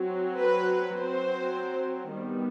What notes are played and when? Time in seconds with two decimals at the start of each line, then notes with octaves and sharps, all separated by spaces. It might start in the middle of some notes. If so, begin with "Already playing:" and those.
Already playing: F#3 C4
0.40 B4
0.97 F#3 C4 C5
2.13 D#3 G3 B3